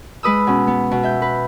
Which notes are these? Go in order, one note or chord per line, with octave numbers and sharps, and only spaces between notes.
G#3 B4 D#6 E6
B2 C#4
B3
B2
E5 G6
B4